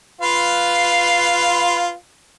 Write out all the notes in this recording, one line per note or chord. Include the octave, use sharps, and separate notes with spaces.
F4 B4 F5